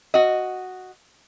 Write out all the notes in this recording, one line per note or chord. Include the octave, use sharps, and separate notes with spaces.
F#4 D#5